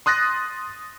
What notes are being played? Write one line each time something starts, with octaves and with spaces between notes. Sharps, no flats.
C6 D#6 F#6 A6 A#6